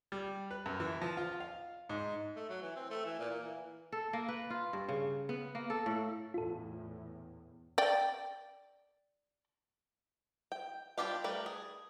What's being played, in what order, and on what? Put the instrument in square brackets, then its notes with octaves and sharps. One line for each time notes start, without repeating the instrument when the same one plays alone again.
[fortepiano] G3
B4
F#2
E3
F3
F4
F5
G#2
[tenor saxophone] A3
F#3
E3
C4
A3
E3
A#2
A#3
E3
[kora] A4
A#3
B4
F4
G2
C#3
B3
A#3
A4
A2
[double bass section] E2 A2 [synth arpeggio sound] F4 A4
[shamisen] D5 G5
[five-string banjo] G5
G3 D4 F4 G4 F5
G3 A3 A#4 B4
G#4